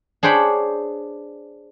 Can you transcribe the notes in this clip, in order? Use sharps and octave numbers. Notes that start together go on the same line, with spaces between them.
D4 G#4 C5 C#5 G5 B5